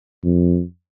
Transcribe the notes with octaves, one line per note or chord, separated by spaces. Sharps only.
F2